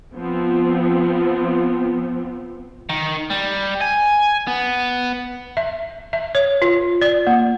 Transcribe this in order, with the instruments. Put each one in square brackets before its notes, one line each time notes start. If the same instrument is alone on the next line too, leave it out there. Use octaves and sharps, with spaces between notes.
[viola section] F3 B3 C4
[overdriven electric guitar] D#3
G3
G#5
B3
[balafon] E5
E5
C#5
F4
D5
A#3